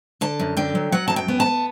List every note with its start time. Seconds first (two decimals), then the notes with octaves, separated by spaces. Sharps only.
0.21 D3 A5
0.40 F#2
0.57 D3 G5
0.75 F#3
0.92 F#3 F#5
1.08 F#2 A5
1.16 G5
1.28 B3
1.40 A5
1.46 B3